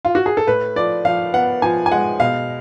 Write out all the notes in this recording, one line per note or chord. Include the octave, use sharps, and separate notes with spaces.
F4
F#4
G#4
A4
A2 B4
F3 D5
F3 F5
B3 F#5
F3 G#5
G#5
G#3 F#5
B2 F5